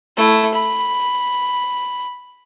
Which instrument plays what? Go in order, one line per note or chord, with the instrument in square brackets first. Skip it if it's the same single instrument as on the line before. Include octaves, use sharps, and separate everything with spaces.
[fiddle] A3 E4
B5